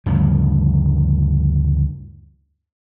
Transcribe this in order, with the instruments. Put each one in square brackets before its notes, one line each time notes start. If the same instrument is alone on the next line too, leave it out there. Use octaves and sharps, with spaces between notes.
[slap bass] D2 G2 C#3 F3